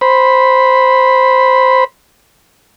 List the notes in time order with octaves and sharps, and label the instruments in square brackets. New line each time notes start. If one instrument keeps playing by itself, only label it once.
[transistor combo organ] C5 B5